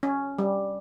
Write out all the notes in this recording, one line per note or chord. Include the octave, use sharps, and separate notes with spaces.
C#4
G3